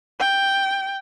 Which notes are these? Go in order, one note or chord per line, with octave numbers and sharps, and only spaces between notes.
G5